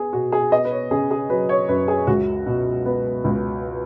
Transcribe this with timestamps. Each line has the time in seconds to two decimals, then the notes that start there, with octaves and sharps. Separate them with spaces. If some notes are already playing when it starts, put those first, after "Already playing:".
Already playing: B3 G#4
0.13 B2 F#4
0.32 G#4
0.51 B3 D#5
0.65 B4
0.71 C#5
0.91 C#3 G#4
1.11 G#4
1.30 F#3 B4
1.49 C#5
1.68 F#2 B4
1.88 G#4
2.07 C#2 F#4
2.46 B2
2.86 B3
3.24 C#2